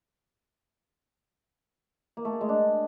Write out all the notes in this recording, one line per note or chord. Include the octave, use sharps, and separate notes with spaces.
A#3
A3
G#4
G#3
D4